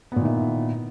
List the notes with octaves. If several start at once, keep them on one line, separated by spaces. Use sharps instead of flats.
A#2 D#3 B3 E4